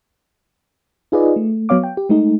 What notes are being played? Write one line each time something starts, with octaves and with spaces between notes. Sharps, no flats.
D#4 F4 G#4 B4 D5 D#5
A3
F#3 B3 C#5 F5 D6
G5
G4
G#3 A3 D#4